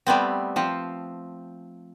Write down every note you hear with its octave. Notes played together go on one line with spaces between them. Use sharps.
G3 A3 B3 C4
F3 C4